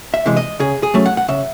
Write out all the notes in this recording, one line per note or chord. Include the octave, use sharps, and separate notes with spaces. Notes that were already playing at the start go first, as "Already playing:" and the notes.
E5
C3 E3 G#3
D#5
C#3 G#4
G#4
F#3 A3 C#4
F#5
F#5
C#3 E5